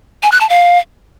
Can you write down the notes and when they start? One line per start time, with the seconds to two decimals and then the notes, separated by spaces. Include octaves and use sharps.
0.23 G#5
0.32 F#6
0.41 A5
0.49 F5